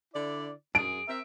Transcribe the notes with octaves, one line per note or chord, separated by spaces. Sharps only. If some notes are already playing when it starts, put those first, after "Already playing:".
D3 E4 D5
F#2 G#4 D7
C4 A#4 E5